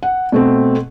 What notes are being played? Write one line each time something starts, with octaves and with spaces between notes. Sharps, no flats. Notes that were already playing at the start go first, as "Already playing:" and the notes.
F#5
B2 A3 C4